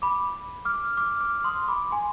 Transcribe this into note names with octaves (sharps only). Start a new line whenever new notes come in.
B5 D6
D6 F6
D6 F6
D6 F6
C6 D#6
B5 D6
G#5 C6